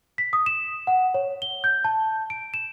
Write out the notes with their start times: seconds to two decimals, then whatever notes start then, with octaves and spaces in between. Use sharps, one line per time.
0.18 B6
0.33 D#6
0.46 E7
0.87 F#5
1.14 C#5
1.42 G7
1.64 G6
1.84 A5
2.30 D7
2.54 E7